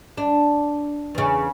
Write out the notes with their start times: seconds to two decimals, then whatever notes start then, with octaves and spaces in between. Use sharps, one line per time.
0.17 D4
1.15 E2 C#3